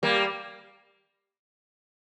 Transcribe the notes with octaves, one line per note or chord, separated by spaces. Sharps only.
G3 A#3